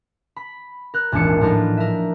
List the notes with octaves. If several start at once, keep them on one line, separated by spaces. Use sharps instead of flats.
B5
A#4 F#6
D#1 G#1 E3 D4 C#7
A2 F3 D4 D#4 F4
A#4 E5